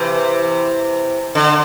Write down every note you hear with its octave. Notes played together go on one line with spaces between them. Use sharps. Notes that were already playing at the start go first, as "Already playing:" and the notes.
Already playing: C3 E3
D3